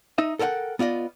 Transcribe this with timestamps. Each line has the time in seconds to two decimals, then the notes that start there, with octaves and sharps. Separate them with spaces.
0.18 D#4 D#5 E5
0.39 A4 A#4 C#5 F#5 G5
0.79 B3 F4 D5 D#5